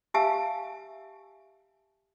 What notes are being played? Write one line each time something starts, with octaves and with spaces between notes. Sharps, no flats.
G4 E5 F5 G#5 A5 E6